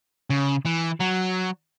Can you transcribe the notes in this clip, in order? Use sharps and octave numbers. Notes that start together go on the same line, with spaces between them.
C#3
E3
F#3